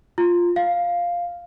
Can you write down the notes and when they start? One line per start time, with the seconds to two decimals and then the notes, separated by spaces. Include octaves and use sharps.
0.18 F4
0.56 F5